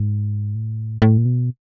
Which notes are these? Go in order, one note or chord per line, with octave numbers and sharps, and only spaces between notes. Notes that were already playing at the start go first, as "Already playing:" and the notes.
Already playing: G#2
A2
A2
A#2
B2